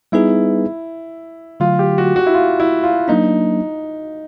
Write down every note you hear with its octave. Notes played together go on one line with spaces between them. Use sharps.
G3 B3 D#4 E4 G#4 B4
D3 F#3 A3 F4
G4
F#4
F#4
E4
F4
E4
F4
F#3 A#3 D4 D#4